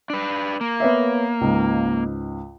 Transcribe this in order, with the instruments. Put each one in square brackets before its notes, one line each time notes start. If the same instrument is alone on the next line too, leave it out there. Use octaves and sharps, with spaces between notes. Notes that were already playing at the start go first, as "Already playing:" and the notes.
[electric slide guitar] D4 B4
A#3
[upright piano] B3 C#5 E5
C#2 G#2